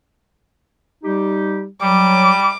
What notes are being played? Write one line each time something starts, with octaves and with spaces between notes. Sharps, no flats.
G3 D#4 G4
F#3 G3 D6